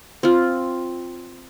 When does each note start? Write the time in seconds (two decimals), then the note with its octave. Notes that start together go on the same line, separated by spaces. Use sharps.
0.23 C4 F4